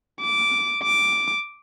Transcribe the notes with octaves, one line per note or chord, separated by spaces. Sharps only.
D6
D6